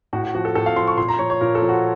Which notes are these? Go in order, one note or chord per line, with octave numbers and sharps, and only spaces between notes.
A2 F#4
F#4
F3 F#4
A4
A2 A4
F5
F3 C6
C#6
A#2 C6
A#5
F3 C#5
C#5
A#2 A#4
A4
F3
F#4